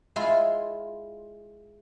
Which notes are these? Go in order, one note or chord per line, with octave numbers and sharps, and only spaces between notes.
G#3 E4 F4